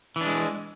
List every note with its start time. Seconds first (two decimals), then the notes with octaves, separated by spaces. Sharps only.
0.16 E3
0.21 D4
0.26 G#3